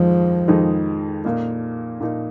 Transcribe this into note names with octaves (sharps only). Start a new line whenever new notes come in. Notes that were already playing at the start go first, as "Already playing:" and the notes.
Already playing: F2 D#3 F3 G#3 D#4 G#4
F2 D#3 G#3 D#4 G#4
A#2 A#3 D#4
A#2 A#3 D#4